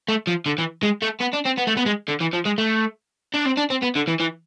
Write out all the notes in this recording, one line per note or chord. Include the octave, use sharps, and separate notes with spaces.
A3
F3
D3
E3
G#3
A3
B3
D4
C4
B3
A3
B3
G#3
D3
E3
F3
G#3
A3
D4
C4
D4
C4
B3
D3
E3
E3